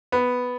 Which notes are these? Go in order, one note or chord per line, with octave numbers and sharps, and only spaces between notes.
B3